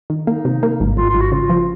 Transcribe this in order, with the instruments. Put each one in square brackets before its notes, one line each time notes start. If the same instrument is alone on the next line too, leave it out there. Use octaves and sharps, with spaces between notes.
[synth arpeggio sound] D#3
[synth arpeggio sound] A#3 [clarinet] D#4
[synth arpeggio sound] C3
A#3
G#1
[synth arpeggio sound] G#1 [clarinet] F4
[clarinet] F4
[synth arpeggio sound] G#1
[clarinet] F#4
[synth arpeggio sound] C#3 [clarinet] F4
[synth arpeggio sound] F3